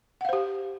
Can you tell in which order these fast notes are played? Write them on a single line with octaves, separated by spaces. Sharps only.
F#5 F5 C5 G4